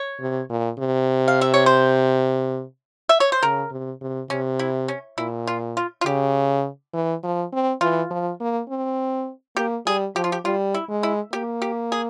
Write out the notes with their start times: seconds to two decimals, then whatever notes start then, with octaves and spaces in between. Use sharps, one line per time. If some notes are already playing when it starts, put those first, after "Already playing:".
Already playing: C#5
0.20 C3
0.50 A#2
0.79 C3
1.28 F5
1.41 E5
1.54 C#5
1.66 C5
3.09 E5
3.20 C#5
3.32 C5
3.43 C#3 A#4
3.71 C3
4.01 C3
4.30 C3 C#4
4.59 E4
4.88 C#4
5.18 A#2 E4
5.47 F4
5.77 F4
6.01 F4
6.05 C#3 G4
6.94 E3
7.23 F3
7.53 C4
7.81 E3 F4
8.11 F3
8.40 A#3
8.69 C4
9.57 A#3 G4
9.86 G3 G#4
10.16 F3 G4
10.24 F4
10.32 G4
10.45 G3 F4
10.74 E4
10.89 G#3
11.03 E4
11.33 A#3 G4
11.62 G4
11.92 G#4